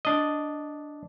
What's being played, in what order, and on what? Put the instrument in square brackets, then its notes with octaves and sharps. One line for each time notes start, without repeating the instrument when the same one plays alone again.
[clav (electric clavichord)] D4 D#5